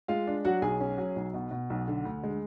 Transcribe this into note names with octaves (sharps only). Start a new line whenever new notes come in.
G#3 F4 F5
D4
F#3 F#4 F#5
B1 G#4 G#5
C#4
F#3
B1
B2
B2
B1
D3
D2
G#3